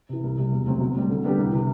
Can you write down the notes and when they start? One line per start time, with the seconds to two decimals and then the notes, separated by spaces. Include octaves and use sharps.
0.09 C3 E3
0.23 C2
0.38 C3 G3
0.52 E1
0.66 D2 C3 F#3 C4
0.80 B1
0.96 A2 G3 C4
1.10 D3
1.24 G3 B3 D4 G4
1.38 C2
1.52 C3 E3